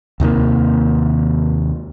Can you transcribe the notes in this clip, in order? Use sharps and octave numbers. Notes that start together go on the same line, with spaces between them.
D#2 C3 D#3 A#3